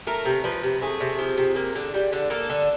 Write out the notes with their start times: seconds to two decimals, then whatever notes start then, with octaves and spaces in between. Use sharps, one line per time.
0.07 A3 A#4
0.25 C3
0.44 F3 B4
0.63 C3
0.81 A3 G#4
1.00 C3
1.19 F3
1.37 C3
1.56 A#3
1.75 D3
1.94 G3
2.12 D3
2.30 A#3 A4
2.50 D3